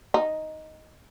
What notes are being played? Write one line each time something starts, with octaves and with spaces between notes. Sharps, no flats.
D#4